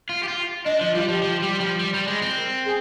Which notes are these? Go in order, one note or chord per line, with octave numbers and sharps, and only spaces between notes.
F4
G4
F4
D4 D#5
F3 D#5
G3 F4
F3 G4
F3
G3
F3
G3
G3
G#3
C4
A#4
G#4